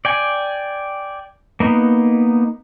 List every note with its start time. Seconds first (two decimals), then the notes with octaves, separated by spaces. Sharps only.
0.05 D5 G5 G#5
1.60 A#3 B3 D#4